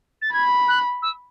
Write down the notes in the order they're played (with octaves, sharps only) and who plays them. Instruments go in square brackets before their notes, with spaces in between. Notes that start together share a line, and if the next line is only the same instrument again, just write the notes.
[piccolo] A6
[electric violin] B5 [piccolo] G#6
[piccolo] F#6
E6